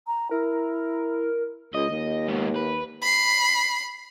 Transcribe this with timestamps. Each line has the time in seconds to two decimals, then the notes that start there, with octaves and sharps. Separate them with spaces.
0.07 A#5
0.31 E4 A#4
1.75 C#2 D#5
1.90 D#2
2.28 G#2 B3
2.56 B4
3.02 B5 C7